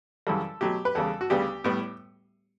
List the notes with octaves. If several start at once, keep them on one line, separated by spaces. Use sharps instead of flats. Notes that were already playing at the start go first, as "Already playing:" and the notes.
F#2 C#3 E3 G3 A4
B2 F#3 A3 G4
B4
E2 C#3 G3 A4
F#4
D2 C#3 G3 B3 G4
A2 G3 B3